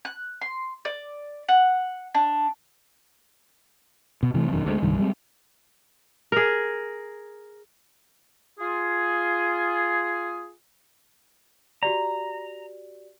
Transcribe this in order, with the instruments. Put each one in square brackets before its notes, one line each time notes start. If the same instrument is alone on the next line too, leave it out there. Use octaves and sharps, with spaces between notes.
[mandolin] F#6
C6
D5
F#5
D4
[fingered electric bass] B2
C3 E3 F#3 A3
E1 F#2 D#3
D2 G#3
D1 C2 G2 D#3
G3 G#3 A#3 C4
[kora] G#4 A#4
[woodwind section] F4 G#4
[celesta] F#4 G4 D5 [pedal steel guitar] A#5